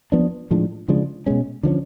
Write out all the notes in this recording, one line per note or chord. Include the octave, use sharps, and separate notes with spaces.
F3 B3 D4
A2 F3 G#3 D4
C#3 F3 G#3 D4
B2 G#3 C#4
D3 F3 A3 C#4